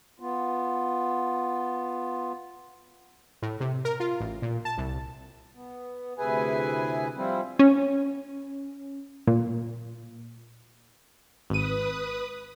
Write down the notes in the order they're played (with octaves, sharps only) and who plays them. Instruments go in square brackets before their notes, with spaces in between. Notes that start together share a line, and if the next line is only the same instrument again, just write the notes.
[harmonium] B3 F4
[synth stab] A2
C3
A#4
F4
A1
A#2
A5
C2
[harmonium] B3
D2 C3 E4 G#4 B4 G#5
F3 G3 C4 E4
[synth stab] C#4
A#2
[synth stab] G#1 D#7 [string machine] B4 D#6